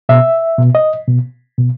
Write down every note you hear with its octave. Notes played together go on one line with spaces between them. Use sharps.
B2 E5
B2
D#5
B2
B2